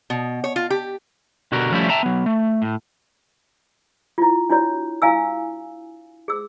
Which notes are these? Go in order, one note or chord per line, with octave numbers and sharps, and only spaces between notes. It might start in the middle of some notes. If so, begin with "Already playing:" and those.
B2
C#5
F4
G4
B2 D3 F#4 G4 A#4
F3 G3 A3 C#4 E4 G4
E5 G5 A5 A#5
F#3 B3
A3
A2
E4 F4
D4 E4 F#4 C#5
E4 F5 G#5 E6
G#4 E6